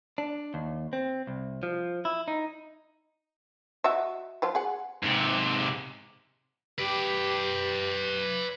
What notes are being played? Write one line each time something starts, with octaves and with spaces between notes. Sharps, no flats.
D4
D#2
C4
C2
F3
E4
D#4
F#4 D#5 E5
F3 F#3 F4
G#4 F#5
G#2 C3
G4 B4 D5